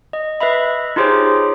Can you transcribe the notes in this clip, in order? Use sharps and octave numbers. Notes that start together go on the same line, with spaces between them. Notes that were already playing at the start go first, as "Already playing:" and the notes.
D#5
B4 D#5 E5 B5
D#4 F4 G4 G#4 C5 C#5